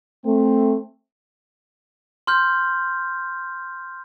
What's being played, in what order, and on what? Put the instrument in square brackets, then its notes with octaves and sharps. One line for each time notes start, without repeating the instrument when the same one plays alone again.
[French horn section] A3 C4
[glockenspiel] C6 F6 G6